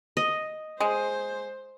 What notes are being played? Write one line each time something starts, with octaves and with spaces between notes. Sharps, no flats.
D#5
G#3 C5